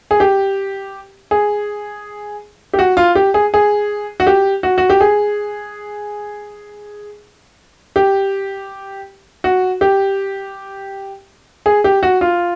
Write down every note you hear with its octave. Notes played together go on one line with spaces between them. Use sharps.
G#4
G4
G#4
G4
F#4
F4
G4
G#4
G#4
F#4
G4
F#4
F#4
G4
G#4
G4
F#4
G4
G#4
G4
F#4
F4